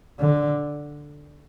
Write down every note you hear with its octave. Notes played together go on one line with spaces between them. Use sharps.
D3